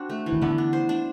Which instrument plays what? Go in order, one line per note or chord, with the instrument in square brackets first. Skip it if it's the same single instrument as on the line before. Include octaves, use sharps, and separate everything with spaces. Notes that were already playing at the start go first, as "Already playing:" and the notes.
Already playing: [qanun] C4 D4 F#4
A3
E3
[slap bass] D#3
[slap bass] D3 [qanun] B3
[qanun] D4
C5
D4